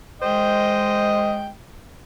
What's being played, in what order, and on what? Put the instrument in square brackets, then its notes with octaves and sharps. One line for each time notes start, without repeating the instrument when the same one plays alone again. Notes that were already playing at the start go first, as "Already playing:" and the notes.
[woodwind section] G#3 [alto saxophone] C5 [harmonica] D#5 G5